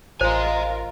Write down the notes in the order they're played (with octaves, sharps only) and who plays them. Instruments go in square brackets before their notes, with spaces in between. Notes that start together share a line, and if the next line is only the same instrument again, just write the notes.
[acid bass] A1 [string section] F4 A#4 [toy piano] C5 [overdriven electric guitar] D#5 G#5